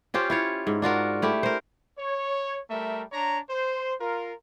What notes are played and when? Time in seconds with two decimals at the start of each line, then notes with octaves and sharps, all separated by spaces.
0.14 C#4 F4 G4 C5
0.30 E4 F4 C#5
0.67 G#2
0.82 D4 F4 F#4 A#4
1.22 A3 E4 G4
1.43 A#4 C5
1.99 C#5
2.70 G3 A3 A#4 E5
3.12 D4 C#5 A#5
3.49 C5
4.01 F4 A#4